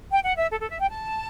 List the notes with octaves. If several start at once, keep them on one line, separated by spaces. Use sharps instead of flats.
G5
F#5
E5
A4
A4
E5
G5
A5